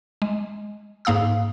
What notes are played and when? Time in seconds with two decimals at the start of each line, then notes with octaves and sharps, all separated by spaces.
0.22 G#3
1.05 G#2 A#3 F5 D#6 E6